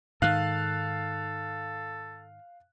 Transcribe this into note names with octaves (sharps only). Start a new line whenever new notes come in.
G#2 D#3 A4 F5 F#6